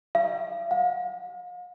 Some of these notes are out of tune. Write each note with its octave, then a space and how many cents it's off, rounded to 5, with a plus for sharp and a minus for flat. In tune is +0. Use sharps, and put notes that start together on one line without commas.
F5 -45
F5 +40